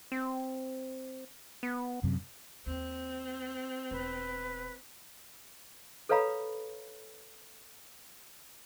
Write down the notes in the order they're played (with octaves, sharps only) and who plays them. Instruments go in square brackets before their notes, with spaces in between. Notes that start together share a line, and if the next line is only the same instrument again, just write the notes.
[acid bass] C4
B3
[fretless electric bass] F#2 C3
[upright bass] D#2 [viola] C4
[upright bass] E1 [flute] B4
[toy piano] A4 B4 C#5 F5 A#5 B5